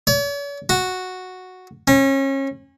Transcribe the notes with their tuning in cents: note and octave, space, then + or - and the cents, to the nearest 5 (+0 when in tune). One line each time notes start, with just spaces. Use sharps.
C#5 +45
F#4 -5
C#4 -30